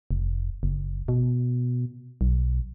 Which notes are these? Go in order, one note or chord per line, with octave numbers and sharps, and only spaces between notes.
F1
F#1
B2
B1